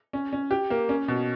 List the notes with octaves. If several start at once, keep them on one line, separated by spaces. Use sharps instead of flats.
C#4
C#4
G4
A#3
C#4
B2